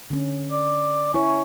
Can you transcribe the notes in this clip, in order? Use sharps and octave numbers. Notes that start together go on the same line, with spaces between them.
D3 C#4
D5
C#4 E4 C#5